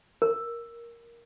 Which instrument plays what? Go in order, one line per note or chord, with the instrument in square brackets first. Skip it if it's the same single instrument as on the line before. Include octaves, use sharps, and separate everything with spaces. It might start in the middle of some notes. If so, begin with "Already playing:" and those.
[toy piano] A#4